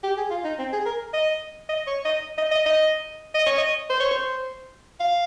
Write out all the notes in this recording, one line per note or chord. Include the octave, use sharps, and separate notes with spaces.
G4
G#4
F4
D#4
C4
G#4
A#4
D#5
D#5
C#5
D#5
D#5
D#5
D#5
D#5
C#5
D#5
C5
C#5
C5
F5